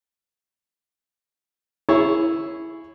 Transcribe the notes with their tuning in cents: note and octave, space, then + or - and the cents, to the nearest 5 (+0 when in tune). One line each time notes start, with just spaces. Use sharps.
E4 +0 G#4 +0 C#5 +0